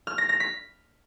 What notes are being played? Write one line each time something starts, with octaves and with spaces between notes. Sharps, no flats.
F6
A#6
A#6
B6